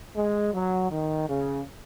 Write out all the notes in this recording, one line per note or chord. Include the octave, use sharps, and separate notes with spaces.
G#3
F#3
D#3
C#3